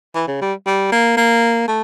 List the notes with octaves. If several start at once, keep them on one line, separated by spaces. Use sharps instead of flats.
E3
C#3
G3
G3
A#3
A#3
A3